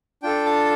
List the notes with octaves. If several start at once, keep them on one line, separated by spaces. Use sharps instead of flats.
D4 F4 A4 G5
A5